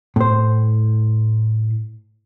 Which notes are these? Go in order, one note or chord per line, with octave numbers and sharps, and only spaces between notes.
A2 C5